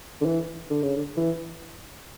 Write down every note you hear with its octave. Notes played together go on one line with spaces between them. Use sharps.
D3
E3
D3
C#3
D3
E3